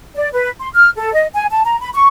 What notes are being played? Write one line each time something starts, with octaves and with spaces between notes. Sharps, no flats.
D5
B4
C6
F6
A4
D#5
G#5
A5
A#5
B5
C#6